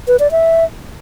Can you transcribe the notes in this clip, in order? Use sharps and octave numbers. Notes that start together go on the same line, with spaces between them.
B4
D5
E5